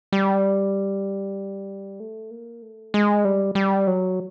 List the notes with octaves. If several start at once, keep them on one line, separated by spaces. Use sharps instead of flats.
G3
A3
A#3
A3
G#3
G3
G3
F#3